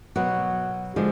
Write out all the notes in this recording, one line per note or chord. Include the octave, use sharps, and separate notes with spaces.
B2 F#3 B3 F#4
D3 F3 G#3